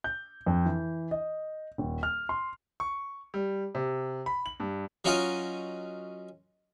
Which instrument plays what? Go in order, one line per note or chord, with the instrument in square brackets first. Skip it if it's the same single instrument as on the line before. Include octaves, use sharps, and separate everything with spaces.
[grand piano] G6
F2
E3
D#5
D#1
F6
C6
C#6
G3
C3
B5
F#7
G2
[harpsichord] F#3 C#4 D#4 F4 A#4 D#5